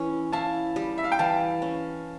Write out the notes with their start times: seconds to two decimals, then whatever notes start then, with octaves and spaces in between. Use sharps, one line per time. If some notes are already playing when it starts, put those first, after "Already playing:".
Already playing: E3 C#4
0.33 E4 F5 A5
0.76 G3
0.98 E5
1.04 F5
1.12 G5
1.19 E3 F5 A5
1.62 C#4